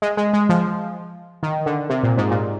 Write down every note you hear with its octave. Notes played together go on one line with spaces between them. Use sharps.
G#3
G#3
G#3
F3
D#3
D3
C3
A#2
G#2
A#2